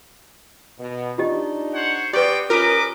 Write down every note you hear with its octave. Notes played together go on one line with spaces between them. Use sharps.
B2
D4 D#4 F4 G4 D#5
C5 C#5 F#5
B3 C4 G4 B4 D5 G5
C#4 F4 A#4 B4 D#5 D6